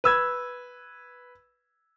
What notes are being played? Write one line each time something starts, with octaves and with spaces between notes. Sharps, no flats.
B4 E6 G#6